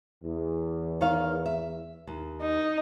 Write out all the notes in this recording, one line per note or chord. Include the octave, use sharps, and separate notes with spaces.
E2
D#3 C#5 F5
E5
D#2
D#4